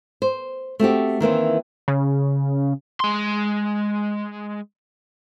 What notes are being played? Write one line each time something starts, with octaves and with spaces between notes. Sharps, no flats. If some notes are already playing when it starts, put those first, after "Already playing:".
C5
A3 C4 F#4 G4
D#3 E3 A#3 C4
C#3
G#3 C6